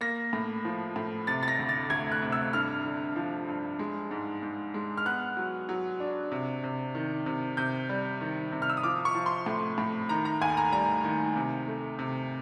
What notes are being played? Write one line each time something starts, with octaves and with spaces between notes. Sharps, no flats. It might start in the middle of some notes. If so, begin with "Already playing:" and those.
A#3 A#6
A2
F3
A2
C3 A6
A6
A#6
D2
A6
D2 G#6
F#6
C3
E6
G2 F6
D3
F3
G2
G#3
G#2
G#2
G#3
F6
B3 F#6
F#3
F#3
D4
C3
C3
D#3
C3
C3 G6
G3
D#3
C3
F6
E6
D#6
F3 D6
C#6
F3
C6
A2
A2
D#3 A#5
A#5
D#2 G#5
A#5
G3 A#5
D#3
C3
A3
C3